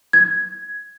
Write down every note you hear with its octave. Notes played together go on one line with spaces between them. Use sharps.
G#6